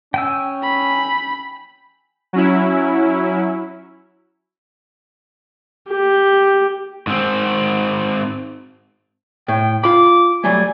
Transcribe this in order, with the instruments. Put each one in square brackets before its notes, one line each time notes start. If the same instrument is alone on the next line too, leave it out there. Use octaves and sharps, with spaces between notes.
[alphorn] C#4 [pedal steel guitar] G5 G#5 E6
[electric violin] B5
[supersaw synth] F#3 C#4 E4
[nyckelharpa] G4
[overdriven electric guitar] G#2 C4
[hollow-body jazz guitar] A2 [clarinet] G5
[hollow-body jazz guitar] F4 B5 [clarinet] D6
[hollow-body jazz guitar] F#3 G3 A3 [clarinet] G#5